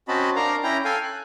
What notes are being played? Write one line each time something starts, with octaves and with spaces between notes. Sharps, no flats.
C4 C#4 F#4 D#5 A5 B5
D4 A#4 F5 A#5
C#4 E4 G5 A#5
A4 F5 G5 G#5
F#6